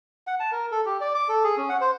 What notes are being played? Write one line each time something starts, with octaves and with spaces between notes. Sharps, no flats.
F#5
A5
A#4
A4
G4
D5
D6
A4
G#4
C#4
F#5
C5